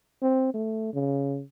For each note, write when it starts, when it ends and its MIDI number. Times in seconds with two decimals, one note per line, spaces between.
0.22 0.51 60
0.54 0.94 57
0.94 1.42 49